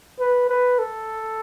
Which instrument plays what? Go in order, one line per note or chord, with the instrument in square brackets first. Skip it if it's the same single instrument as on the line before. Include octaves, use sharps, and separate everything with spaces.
[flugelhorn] B4
B4
A4